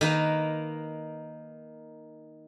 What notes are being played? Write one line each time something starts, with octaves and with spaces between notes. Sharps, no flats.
D#3 A#3 B4